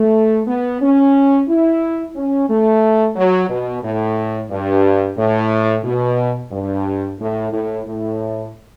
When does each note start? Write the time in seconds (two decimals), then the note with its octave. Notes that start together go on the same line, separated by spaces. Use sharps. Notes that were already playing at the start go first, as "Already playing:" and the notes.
Already playing: A3
0.47 B3
0.81 C#4
1.49 E4
2.16 C#4
2.49 A3
3.16 F#3
3.49 B2
3.83 A2
4.50 G2
5.17 A2
5.84 B2
6.52 G2
7.19 A2
7.52 A2
7.86 A2